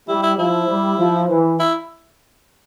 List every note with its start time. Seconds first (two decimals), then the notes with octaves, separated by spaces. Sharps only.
0.08 G3 E4
0.23 E4
0.38 F3 E4
0.68 G3
0.98 F3
1.29 E3
1.60 E4